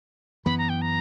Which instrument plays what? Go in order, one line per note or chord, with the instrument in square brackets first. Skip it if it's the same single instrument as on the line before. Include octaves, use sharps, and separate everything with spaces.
[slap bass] F#2 E3 B3 [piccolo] B5
[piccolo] A#5
G5
A#5